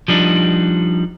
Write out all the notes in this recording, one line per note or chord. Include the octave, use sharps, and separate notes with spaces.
F3 G3 D4 D#4